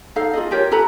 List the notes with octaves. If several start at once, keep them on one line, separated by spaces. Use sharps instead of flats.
D#4 A4 F5
F4 G#4 D#5
F4 G4 A#4 C#5
A4 B4 A#5 B5